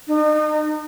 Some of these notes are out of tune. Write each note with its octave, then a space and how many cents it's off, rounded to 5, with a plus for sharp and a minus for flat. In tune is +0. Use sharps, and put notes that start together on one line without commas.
D#4 -40